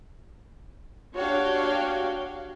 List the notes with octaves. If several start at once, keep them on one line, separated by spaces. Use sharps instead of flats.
D4 F#4 G4 C#5 F5 G5